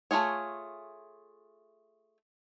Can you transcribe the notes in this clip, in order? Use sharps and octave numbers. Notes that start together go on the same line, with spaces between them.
A3 E4 F4 G#4 C#5